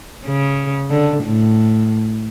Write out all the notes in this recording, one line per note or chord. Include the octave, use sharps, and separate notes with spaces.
C#3
D3
A2